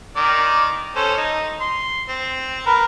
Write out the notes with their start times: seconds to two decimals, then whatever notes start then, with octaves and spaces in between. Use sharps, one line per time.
0.16 D#3 D5
0.96 C#4 A4 C5
1.17 D#4
1.61 C6
2.09 C4
2.66 A#4 B4